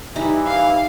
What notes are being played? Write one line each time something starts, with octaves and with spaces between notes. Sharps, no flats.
E3 G3 D#4 E4
F5